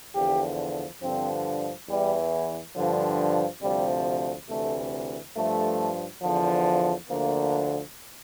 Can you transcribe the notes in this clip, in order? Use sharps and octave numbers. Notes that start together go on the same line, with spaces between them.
E2 D3 F3 G4
G2 D3 F3 C4
E2 E3 G3
G2 D3 F3
D2 C3 F3 G3
D2 C3 E3 A3
G2 F3 A3
E2 D3 F3
D2 D3 F3 A#3